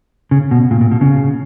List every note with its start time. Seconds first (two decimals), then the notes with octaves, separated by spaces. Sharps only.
0.31 C#3
0.51 B2
0.71 A#2
0.81 A#2
0.91 B2
1.01 C#3